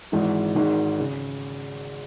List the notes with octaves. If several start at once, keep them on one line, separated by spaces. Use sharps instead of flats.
G#1 G#2 E3 G#3 D#4
G#1 G#2 D#3 G#3
C#3